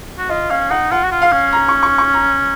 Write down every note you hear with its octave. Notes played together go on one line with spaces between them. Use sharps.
F#4
F4 D#5
C#4 F5
D#4 F#5
F4 F#5
F#4
F4
F5
C#4
A#5
C#6
C#6
C#6
A#5